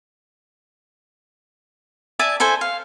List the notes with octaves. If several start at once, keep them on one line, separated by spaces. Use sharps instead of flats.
D5 E5 G#5 A5
E4 A4 C5 G#5
F5